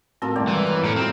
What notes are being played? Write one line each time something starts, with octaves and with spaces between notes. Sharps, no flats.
A2 C4 F4 F#4 A4 A#4
G1 C2 A3 D5
E3 G#3
A#4 C#5 A#5
C2 A2 G3 C#4 A4 D5 A#5 F6
F#3 C4 F6